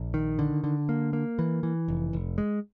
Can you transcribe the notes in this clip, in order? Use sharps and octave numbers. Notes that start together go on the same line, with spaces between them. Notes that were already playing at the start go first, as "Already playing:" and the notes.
Already playing: A#1
D#3
D3
D3
A#3
A#3
E3
E3
F1
F1
G#3